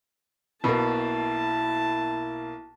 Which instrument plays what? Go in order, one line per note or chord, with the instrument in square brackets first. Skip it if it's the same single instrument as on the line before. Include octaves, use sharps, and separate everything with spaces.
[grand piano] B1 A#3 [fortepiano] B2 [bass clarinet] E4 [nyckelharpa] A5